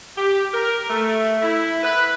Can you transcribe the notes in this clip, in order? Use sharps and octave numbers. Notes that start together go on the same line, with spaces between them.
G4
A#4
A3
E4
B4